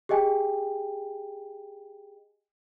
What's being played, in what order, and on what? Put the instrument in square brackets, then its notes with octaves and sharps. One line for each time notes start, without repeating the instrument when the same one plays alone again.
[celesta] G4 G#4 D#5 G5 G#5